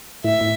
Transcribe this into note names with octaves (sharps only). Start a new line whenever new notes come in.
A2 E5
A2